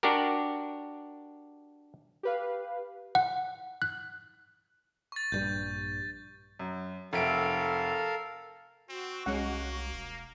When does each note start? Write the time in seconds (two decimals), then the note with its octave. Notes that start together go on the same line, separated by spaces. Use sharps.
0.03 D4 F#4 G4 A#4
2.23 G4 B4 F5
3.15 F#5
3.82 F#6
5.12 C#6 A6
5.32 A#1 G2 G3 G6
6.59 F#2
7.13 F1 A4 A#4 E5 F5 D7
8.89 C4 F#4
9.26 C2 G#3 A#3 C#4 F#5
9.93 E1